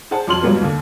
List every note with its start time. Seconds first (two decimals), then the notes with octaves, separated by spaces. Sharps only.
0.11 G#4 C5 F#5 A5
0.27 F2 F#3 C6 F6 F#7
0.43 F2 G#2 F#3 G3 A#3 B3
0.61 D#2 D3 A#3